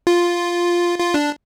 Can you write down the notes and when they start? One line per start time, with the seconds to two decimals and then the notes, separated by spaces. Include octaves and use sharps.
0.07 F4
0.99 F4
1.14 D4